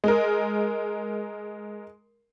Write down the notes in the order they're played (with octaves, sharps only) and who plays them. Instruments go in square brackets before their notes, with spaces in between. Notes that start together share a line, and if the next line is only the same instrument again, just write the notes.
[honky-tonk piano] G#3 A#4